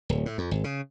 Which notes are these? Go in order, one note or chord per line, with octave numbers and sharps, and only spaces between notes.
D1
A2
F2
G#1
C#3